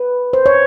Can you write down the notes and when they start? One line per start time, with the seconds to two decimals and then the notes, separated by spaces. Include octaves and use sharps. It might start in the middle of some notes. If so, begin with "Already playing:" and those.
Already playing: B4
0.33 C5
0.46 C#5